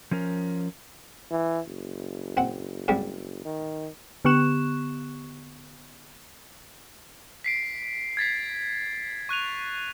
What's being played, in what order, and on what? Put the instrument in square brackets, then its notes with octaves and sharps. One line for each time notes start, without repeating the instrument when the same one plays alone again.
[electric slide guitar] F3 C#4 A#4
[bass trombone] E3
F#1
[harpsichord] C4 F#5
G#2 C3 G3
[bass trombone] D#3
[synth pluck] D3 B3 G4 C#6 F#6 E7
[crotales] B6 C7 D7
G#6 A6 B6 C7
C#6 F#6 D#7 F7